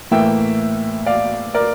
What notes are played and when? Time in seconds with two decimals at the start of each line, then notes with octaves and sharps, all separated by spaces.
0.11 A2 E3 A#3 E5 G5
1.06 D5 F5
1.54 A#4 D5